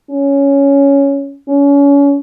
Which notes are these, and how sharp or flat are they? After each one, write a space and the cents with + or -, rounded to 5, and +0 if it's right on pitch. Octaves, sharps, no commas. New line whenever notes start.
C#4 +5
C#4 +30